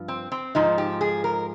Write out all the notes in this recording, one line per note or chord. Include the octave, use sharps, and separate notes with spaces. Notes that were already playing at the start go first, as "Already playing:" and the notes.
Already playing: G2 F3
C4
C4
G#2 F3 D#4
G4
G#4
A#4